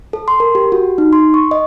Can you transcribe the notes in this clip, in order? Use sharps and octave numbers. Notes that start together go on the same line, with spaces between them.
A4
C6
A#4
G4
F#4
D#4
C6
C#6
D#5